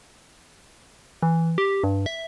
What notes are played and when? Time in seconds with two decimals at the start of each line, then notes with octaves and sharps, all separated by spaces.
1.23 E3
1.58 G4
1.84 G2
2.06 E5